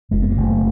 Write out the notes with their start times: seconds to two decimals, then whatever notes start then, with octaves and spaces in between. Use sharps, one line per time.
0.11 F#1 G#3
0.22 B3
0.30 A#3
0.37 F#1 A3